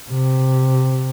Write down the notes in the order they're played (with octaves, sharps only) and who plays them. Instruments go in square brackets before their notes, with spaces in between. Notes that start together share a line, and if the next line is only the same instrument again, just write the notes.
[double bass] C3